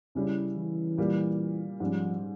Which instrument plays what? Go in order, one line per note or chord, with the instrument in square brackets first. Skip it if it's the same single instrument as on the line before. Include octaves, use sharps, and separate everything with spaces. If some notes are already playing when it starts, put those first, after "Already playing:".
[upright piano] C#3 G3 C#4 E4
[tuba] E3
[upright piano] A#2 G3 A#3
[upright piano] G#2 G3 C#4 [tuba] F3